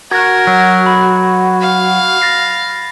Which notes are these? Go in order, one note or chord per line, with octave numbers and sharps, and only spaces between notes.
F#4 A#4 G#6
F#3
B5
F5
A6 A#6 C7